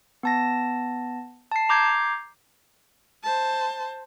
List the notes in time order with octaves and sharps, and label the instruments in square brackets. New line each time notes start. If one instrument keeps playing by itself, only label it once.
[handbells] B3 A5 A#6
A5 C7
A#5 D6 G6 G#6 C7
[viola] C5 A5